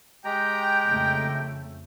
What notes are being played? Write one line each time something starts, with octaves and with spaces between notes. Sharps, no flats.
G#3 G4 G5 A#5
F2 C#3 A3